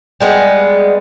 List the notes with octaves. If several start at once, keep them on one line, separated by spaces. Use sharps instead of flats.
G3 G#3 A#3 B3